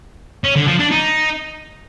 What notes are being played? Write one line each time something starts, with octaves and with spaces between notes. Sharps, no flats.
C#4
D3
F3
D4
D#4